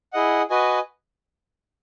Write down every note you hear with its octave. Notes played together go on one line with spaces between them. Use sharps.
E4 G#4 D#5 F#5
F#4 B4 D#5 G#5